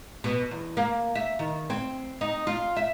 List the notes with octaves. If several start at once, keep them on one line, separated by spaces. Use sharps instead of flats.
B2
E2
A#3
E5
D#3
C4
D#4
F4
E5